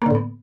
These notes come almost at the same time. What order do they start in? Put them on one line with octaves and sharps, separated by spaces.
A#3 D3 A2 B3